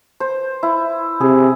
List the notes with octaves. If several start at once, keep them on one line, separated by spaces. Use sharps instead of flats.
C5
E4
C3 G#4